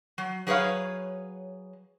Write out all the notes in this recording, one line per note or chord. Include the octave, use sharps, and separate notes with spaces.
F#3
F#3 G#4 B4 C#5 F5